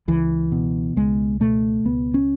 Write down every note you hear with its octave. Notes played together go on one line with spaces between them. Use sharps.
C#2 E3
B2
C#2 G#3
B2 A3
C#2 B3
C#4